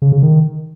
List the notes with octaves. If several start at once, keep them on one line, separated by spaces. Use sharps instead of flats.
C#3
C#3
D#3